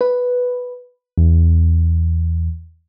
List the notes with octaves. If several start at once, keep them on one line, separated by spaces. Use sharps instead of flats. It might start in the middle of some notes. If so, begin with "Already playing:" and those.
B4
E2